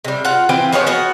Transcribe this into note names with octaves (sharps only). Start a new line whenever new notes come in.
C3 G3
F4 F#5
E3 C4 F4 G4
F3 B3 G#4 C#5
F3 B3 F#4